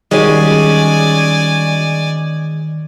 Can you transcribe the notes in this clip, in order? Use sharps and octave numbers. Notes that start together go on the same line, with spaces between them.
D#3 G3 G#3 C#4 F#4 D5 G#5